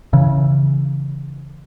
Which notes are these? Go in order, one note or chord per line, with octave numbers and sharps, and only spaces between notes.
C#3 E3